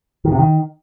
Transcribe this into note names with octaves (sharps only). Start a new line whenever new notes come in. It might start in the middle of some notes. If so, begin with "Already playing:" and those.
D#3
C3
D#3